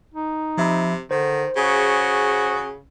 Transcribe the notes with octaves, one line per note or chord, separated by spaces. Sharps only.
D#4
C3 F3 E5 B5
D3 D#3 C5
C#3 F#4 G#4